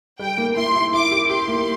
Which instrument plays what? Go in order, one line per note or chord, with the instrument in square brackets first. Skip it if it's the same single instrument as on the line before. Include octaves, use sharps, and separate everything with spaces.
[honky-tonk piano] G3 [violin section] G5
[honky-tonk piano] A#3
[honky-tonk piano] E4 [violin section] C6
[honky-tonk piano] E4
[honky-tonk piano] E4 [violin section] D6
[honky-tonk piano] G4
[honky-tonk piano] G4 [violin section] C6
[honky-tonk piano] A#3